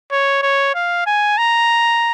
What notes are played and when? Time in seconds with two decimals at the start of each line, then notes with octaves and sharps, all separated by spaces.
0.12 C#5
0.43 C#5
0.75 F5
1.06 G#5
1.38 A#5